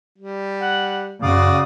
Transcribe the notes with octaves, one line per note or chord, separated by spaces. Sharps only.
G3
F#5
F#2 C#3 F#4 D5 F5 D#6